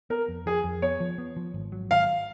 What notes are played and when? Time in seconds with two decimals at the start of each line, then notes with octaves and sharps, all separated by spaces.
0.10 B3 A#4
0.28 F2
0.46 F3 G#4
0.64 F2
0.82 B3 C#5
1.00 F3
1.18 B3
1.36 F3
1.54 G#1
1.72 F#3
1.91 G#1 F5